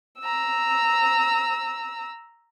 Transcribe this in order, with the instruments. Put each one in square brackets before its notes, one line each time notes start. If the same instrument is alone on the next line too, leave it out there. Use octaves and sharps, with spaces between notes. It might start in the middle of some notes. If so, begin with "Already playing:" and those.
[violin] A#5 E6